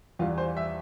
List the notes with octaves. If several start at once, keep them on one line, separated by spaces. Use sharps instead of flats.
E2 E3 G3 F4
C5
E5